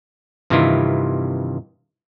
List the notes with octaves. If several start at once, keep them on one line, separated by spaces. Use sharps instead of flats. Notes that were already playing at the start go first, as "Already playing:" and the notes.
G2 C3 D#3 E3 E4 F4